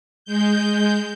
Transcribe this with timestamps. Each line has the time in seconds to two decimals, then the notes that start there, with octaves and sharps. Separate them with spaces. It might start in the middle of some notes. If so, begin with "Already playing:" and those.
0.25 G#3 G6